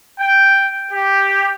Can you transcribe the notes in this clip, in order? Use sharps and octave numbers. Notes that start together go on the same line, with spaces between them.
G5
G4